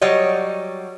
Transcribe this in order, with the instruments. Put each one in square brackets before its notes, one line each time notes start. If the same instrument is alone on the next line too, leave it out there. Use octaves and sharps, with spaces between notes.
[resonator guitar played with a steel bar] F#3 G3 C#5 D#5